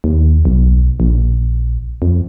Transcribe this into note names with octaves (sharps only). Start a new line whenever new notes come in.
D#2
B1
A#1
F2